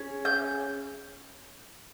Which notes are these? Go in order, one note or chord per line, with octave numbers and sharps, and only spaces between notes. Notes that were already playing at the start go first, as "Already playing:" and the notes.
Already playing: C#4 G#4
G6